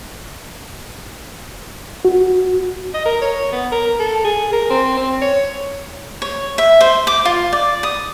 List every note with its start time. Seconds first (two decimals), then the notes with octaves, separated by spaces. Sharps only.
2.05 F#4
2.94 D#5
3.06 A#4
3.22 C#5
3.52 B3
3.72 A#4
4.00 A4
4.25 G#4
4.53 A#4
4.70 C4
4.97 C4
5.22 C#5
6.22 C#5
6.58 E5
6.81 C5
7.07 D6
7.25 F4
7.53 D5
7.83 D#6